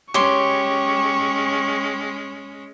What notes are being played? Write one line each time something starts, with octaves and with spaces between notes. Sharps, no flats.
G#3 C#4 G4 C#5 C6 C#6